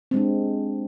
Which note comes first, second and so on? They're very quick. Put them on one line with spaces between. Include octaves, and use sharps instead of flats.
C4 G#3 D4